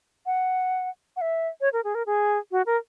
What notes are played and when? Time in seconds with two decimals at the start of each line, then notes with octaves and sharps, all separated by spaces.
0.26 F#5
1.16 F#5
1.21 E5
1.61 C#5
1.73 A#4
1.84 G#4
1.95 A#4
2.06 G#4
2.51 F#4
2.66 A#4